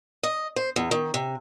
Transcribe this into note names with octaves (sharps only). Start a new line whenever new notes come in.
D#5
C5
E2
D#3
C3